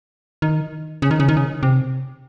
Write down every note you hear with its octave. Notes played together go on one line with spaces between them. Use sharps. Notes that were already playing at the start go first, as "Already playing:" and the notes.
D#3
C#3
D#3
C#3
D#3
C#3
C3